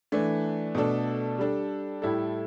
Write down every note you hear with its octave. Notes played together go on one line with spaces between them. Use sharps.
E3 A3 D4
B2 A3 D4 A4
G3 D4 A4
A2 G3 E4 A4